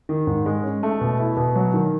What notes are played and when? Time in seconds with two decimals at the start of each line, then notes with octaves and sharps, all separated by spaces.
0.09 D#3
0.27 G#2
0.46 G#3
0.63 C#4
0.83 A3
1.01 B2
1.19 E4
1.37 B2
1.55 F#3
1.74 D#3